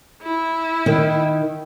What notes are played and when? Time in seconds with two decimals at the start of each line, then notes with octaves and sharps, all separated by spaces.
0.23 E4
0.86 D#3